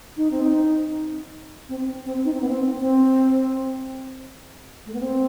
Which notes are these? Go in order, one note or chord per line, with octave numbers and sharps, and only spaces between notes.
D#4
C4
D#4
C4
C4
D#4
C4
B3
C4
C4
A3
B3
C4